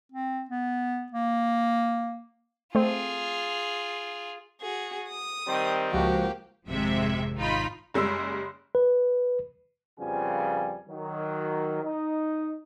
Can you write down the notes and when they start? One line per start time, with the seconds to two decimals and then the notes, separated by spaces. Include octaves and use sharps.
0.12 C4
0.49 B3
1.12 A#3
2.75 A3 C4 F4 G#4
4.61 F#4 G#4
5.08 D#6
5.47 D#3 G3 C4
5.91 C#2 F3 A#3 F#4 G4
6.67 G#1 F2 C3 G#3 E5
7.37 G#1 D#4 F4 B5
7.94 F#1 G3 G#3 E6
8.75 B4
9.99 F2 C#3 F3 G3 B3 G#5
10.88 D#3 F#3
11.83 D#4